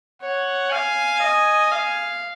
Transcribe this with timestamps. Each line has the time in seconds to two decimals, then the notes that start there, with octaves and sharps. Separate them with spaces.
0.22 C#5 F#5
0.71 F5 G#5
1.22 D#5
1.72 F5